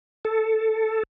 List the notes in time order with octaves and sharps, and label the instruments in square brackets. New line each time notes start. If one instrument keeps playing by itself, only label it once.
[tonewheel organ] A4